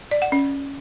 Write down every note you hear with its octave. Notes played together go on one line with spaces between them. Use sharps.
D5
F#5
C#4